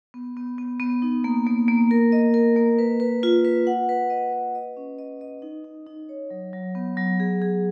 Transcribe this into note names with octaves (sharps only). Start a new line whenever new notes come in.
B3
B3
B3
B3
D#4
A#3
A#3
A#3
A#4
D#5
A#4
A#3
B4
B4
F4
B4
F#5
B4
D#5
B4
D#5
C#4
D#5
D#5
D#4
D#4
D#4
C#5
F#3
F#3
B3
F#3
G#4
G#4